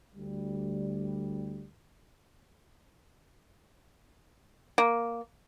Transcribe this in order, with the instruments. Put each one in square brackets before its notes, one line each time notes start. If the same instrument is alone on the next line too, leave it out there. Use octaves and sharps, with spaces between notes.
[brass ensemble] D2 G3
[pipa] A#3